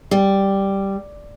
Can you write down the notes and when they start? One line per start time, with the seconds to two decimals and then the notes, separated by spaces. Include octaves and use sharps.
0.11 G3